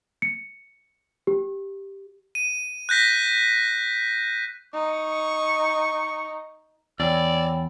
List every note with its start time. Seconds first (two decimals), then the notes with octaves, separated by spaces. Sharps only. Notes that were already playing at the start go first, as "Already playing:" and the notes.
0.22 C#7
1.27 G4
2.35 D#7
2.89 F#6 G6 A#6 B6
4.74 D#4 C#6
7.00 E2 C#5 D5 G5 B5 E6